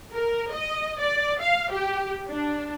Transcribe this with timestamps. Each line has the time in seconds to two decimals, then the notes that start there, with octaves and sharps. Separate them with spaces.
0.13 A#4
0.52 D#5
1.00 D5
1.41 F5
1.71 G4
2.28 D4